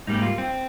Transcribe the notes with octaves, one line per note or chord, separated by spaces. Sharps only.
G#2 G3 A#3 D#4
F4
C4